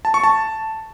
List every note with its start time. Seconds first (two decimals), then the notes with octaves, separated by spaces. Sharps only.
0.05 A5
0.14 C#6
0.24 A5